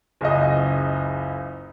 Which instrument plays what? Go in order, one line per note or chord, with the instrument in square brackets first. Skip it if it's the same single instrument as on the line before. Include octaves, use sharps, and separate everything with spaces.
[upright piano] F#1 C#2 D#5